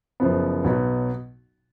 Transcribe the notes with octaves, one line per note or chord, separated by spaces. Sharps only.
F#1 F#2 F3 B3
B1 B2 F#3 B3